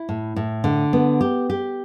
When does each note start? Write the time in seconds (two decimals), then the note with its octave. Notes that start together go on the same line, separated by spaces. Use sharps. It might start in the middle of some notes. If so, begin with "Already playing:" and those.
Already playing: E4
0.09 A2
0.36 A2
0.64 D3
0.93 B3
1.21 G4
1.50 G4